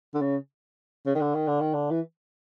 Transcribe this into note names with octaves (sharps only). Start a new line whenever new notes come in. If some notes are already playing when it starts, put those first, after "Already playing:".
D3
C#3
C#3
D#3
D3
D#3
D3
D#3
D3
E3